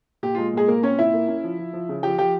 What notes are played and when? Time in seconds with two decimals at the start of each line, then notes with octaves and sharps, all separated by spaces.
0.23 A#2 G4
0.35 G#3 F4
0.53 A#2 G#3 G#4
0.68 A#2 A#3 A#4
0.83 C4 C#4 C#5
0.99 A#2 E4 E5
1.13 A#3
1.28 C#4
1.44 F3
1.59 F3
1.73 F3
1.89 C#3
2.03 F3 G4 G5
2.18 F3 G4 G5